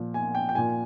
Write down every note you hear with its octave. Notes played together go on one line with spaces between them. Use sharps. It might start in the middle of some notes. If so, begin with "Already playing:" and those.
Already playing: A#2 F3
G#5
G5
G5
A#2 F3 G#5